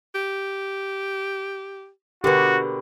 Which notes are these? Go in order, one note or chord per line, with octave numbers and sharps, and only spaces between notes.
G4
B2 D3 F#4 G4 A#4 B4